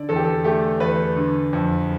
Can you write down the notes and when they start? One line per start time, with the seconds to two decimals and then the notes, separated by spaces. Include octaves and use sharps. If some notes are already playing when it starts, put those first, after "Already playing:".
Already playing: D3 D5
0.09 E2 A4
0.16 G4
0.24 A4
0.44 A3 G4
0.80 E2 B4
1.16 D3
1.53 F2